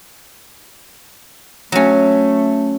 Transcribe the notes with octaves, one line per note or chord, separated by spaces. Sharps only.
F#3 A3 C#4